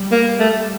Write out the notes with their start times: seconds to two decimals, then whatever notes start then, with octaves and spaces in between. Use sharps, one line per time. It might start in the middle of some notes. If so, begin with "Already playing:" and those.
Already playing: G3
0.12 A#3
0.40 A3